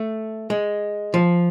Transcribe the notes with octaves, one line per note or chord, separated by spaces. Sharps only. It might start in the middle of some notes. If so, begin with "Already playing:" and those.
Already playing: A3
G#3
F3